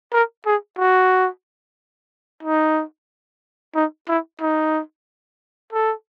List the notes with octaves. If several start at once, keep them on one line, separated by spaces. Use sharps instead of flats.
A#4
G#4
F#4
D#4
D#4
E4
D#4
A4